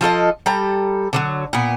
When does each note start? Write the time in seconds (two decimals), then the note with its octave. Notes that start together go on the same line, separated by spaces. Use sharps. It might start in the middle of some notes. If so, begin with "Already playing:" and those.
0.01 F3 F4 A4 D#5
0.46 G3 A4 A#5
1.13 D3 F3 F#3
1.53 A#2 B3